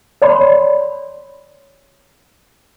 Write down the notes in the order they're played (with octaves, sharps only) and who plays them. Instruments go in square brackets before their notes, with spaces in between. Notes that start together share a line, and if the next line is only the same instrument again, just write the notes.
[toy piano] C#5 D5 B5 C6